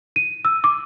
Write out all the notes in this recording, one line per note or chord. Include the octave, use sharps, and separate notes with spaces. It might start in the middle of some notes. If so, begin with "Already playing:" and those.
D#7
E6
D6